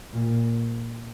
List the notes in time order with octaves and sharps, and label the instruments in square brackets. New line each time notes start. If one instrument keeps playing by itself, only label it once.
[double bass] A#2